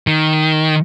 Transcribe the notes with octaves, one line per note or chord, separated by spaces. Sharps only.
D#3